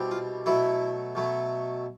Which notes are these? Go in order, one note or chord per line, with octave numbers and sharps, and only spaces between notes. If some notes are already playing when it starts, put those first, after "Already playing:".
Already playing: C2 B2 G3 C4
F4
B2 F#3 A3 E4
B2 F#3 A3